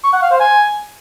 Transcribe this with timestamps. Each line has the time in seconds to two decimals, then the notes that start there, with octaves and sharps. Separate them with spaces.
0.04 C#6
0.13 F#5
0.22 F5
0.31 C5
0.40 G#5